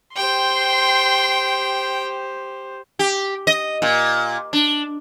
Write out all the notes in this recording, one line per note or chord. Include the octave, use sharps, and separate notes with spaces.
G4 C5 G5 C6
G4
D#5
A#2
D4